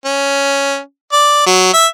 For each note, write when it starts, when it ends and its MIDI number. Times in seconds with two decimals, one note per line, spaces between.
0.05 0.78 61
1.13 1.42 74
1.47 1.72 54
1.74 1.86 76